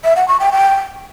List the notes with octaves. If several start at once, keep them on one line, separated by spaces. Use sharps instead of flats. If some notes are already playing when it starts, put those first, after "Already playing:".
E5
F#5
C#6
G5
G5